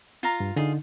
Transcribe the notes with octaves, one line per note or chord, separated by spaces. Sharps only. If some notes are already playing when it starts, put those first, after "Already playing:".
F4 F5 A#5
G2
D3 D#4 F4 G#4